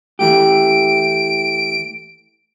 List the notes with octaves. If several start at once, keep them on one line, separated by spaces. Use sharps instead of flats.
E3 A3 G4 D7